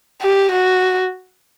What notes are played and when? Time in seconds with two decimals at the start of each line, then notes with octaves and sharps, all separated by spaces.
0.22 G4
0.52 F#4